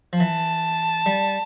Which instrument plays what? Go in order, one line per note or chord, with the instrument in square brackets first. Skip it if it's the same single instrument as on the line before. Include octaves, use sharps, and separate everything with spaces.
[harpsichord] F3
[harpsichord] E3 [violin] A5
[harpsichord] G3